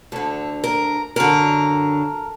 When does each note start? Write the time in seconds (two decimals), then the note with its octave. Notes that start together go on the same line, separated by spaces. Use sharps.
0.12 D2 D3 A4
0.64 A#4
1.16 F#2 D3 A#4